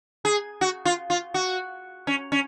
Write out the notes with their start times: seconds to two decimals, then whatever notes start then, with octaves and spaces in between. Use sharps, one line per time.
0.25 G#4
0.61 F#4
0.85 F4
1.10 F4
1.34 F#4
2.07 C#4
2.32 C#4